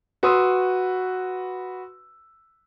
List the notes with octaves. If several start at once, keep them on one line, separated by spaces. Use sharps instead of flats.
F#4 B4 C6 D#6 E6